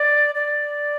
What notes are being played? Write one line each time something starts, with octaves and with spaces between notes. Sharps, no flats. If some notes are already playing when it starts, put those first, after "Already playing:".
Already playing: D5
D5